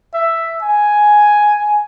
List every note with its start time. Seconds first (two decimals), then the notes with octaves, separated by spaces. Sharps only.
0.14 E5
0.62 G#5